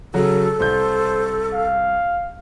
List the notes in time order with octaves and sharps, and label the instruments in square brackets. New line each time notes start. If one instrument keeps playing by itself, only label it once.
[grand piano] C#3 F#3 F#4 [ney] A4
[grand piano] C2 G6 [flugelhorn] C5
[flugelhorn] F5